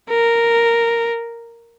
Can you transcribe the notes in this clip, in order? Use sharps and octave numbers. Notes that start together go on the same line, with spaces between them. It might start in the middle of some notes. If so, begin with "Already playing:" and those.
A#4